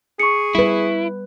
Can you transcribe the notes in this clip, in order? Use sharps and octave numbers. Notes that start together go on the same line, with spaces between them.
G#4 C#6 C#7
G3 E4 B4